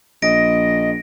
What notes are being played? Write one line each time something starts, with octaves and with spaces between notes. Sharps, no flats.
A#1 D#5 A#6 D7